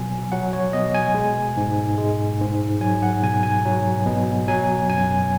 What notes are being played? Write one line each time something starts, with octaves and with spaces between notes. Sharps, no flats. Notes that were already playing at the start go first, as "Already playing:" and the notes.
Already playing: B2 F#3 G#5
F#3 F#5
C#5
B2 D#5
G#5
G#3
G#2
G#3
G#2
F#3 G#5
F#5
B2 G#5
G#5
F#3
B2
F#3 G#5
F#2 G#5